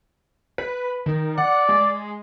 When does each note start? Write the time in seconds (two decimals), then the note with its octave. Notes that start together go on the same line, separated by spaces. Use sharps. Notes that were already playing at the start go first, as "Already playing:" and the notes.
0.58 B4
1.06 D#3
1.38 D5 F#5
1.69 G#3